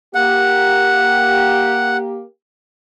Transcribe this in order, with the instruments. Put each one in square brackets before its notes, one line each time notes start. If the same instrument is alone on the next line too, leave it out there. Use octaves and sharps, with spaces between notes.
[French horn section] A#3 G4 [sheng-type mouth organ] F#5